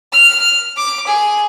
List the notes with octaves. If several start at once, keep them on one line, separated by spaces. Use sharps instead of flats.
F6
D6
G#4